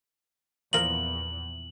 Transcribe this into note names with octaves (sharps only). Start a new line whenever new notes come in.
E2 A#2 F3 A#4 F#7